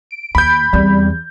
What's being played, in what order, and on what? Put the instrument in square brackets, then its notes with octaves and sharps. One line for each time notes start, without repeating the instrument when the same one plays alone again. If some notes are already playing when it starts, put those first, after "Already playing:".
[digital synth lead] D7
[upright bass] D#2 [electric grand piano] B5 G6
[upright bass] E2 C4 [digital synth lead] G3